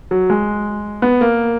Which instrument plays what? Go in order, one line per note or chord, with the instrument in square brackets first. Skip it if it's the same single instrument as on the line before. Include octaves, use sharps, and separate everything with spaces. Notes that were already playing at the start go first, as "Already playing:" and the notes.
[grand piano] F#3
G#3
B3
A#3